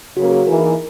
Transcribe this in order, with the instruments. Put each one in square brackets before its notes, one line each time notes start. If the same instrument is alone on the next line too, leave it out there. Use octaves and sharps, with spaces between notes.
[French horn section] C#3 F#3 A#3 C#4 [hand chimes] F#4
[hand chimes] G#4
[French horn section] E3 A#3 D#4 [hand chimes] A#4